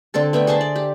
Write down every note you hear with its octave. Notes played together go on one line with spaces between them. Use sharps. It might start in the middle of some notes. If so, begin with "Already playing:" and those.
D3 C4 A4 A5
A3 B3 E5 G5
G#4 C5 E5 A5
D5
G4